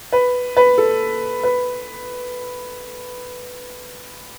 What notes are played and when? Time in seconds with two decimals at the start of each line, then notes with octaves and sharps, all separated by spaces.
0.12 B4
0.57 B4
0.78 A4
1.43 B4